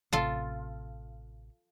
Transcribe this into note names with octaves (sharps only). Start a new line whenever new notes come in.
A1 C3 F4 A4